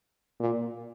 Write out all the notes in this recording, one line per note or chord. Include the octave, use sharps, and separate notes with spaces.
A#2